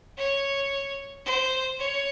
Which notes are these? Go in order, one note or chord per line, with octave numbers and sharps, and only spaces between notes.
C#5
C5
C#5